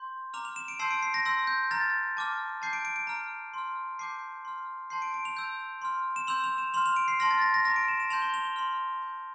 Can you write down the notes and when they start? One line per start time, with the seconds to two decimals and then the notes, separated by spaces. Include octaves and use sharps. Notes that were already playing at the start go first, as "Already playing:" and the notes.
Already playing: C6 G6
0.34 A#5 D6 F6 F7
0.45 F7
0.56 E7
0.68 D7
0.79 A5 C6 E6 G6 C7
0.91 D7
1.03 C7
1.14 A#6
1.25 C6 E6 G6 A#6
1.47 G6
1.71 A#5 F6 A6
2.17 A5 D6 F6
2.62 A5 D6 G6 C7
2.73 D7
2.85 D7
2.96 D7
3.07 A#5 F6
3.54 C6 F6
3.99 A5 D6 G6 C7
4.45 C6 F6
4.90 A5 C6 G6 C7
5.02 D7
5.14 D7
5.25 F7
5.37 A5 E6 G6
5.82 C6 F6
6.16 E7
6.27 C6 E6 G6 F7
6.44 F7
6.58 E7
6.74 C6 F6 F7
6.86 F7
6.96 D7
7.08 C7
7.20 A5 C6 F6 A#6
7.31 A6
7.42 A#6
7.54 A#6
7.64 A#5 D6 F6 A#6
7.76 D7
7.88 E7
8.00 E7
8.10 A5 C6 G6 F7
8.22 G7
8.34 F7
8.45 G7
8.56 C6 F6 F7
9.02 C6 G6